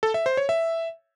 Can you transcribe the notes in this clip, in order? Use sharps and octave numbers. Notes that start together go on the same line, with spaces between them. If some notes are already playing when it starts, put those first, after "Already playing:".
A4
E5
C5
C#5
E5